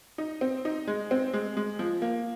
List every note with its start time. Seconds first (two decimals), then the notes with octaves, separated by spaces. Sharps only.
0.18 D#4
0.41 C4
0.65 D#4
0.87 G#3
1.11 C4
1.33 G#3
1.57 G#3
1.79 F3
2.02 A#3